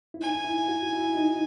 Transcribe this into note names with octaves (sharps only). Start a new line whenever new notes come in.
E4
D#4 G#5
E4
F#4
E4
D#4